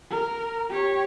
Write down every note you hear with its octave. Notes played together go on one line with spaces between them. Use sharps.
A#4
G4 C#5